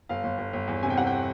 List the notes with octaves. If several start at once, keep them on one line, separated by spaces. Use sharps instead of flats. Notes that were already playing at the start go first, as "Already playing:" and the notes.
G1 F5
G1
G1
G1
E2
C3 G#5
G5
C3 F#5
G5